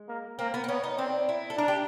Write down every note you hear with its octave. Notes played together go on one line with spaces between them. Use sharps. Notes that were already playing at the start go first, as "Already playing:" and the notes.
Already playing: G#3
A#3
A#3 C4
B3
C4
B3 C#4
D#4
C4 D4
E4
A4
D4 A#4
G4